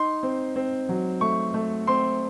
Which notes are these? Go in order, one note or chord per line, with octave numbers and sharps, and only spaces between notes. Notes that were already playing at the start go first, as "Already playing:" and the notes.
Already playing: D#4 C6
C4
C4
F#3
A3 C#6
A3
C4 C6